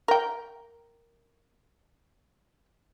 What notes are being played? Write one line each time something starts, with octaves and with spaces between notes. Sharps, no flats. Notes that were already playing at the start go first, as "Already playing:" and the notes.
A#4 G5